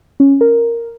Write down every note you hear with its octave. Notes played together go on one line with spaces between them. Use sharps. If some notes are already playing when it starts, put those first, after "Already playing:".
C#4
A#4